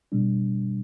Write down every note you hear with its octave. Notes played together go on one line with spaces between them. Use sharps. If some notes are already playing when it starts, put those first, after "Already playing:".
B2 G3 D4